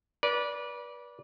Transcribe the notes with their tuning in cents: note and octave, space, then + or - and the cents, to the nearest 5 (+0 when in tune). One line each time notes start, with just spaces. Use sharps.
B4 -30 D5 -15